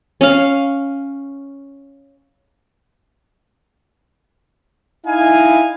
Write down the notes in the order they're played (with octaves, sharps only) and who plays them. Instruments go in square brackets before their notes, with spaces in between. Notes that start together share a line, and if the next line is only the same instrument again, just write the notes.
[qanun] C#4 F5
[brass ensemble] D#4 E4 F5 G#5